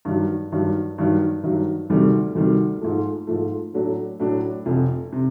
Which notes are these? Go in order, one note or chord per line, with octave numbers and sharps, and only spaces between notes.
G2 D#3 F#3
G2 D#3 F#3
G2 D#3 F#3
G2 D#3 F#3
D2 C3 D#3 G3
D2 C3 D#3 G3
G#2 F3 A3
G#2 F3 A3
A2 F#3 A3 D4
A2 F#3 A3 D4
F1 F2 C3
C3